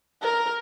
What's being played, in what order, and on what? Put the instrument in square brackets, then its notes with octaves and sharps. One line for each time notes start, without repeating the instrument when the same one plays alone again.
[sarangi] A#4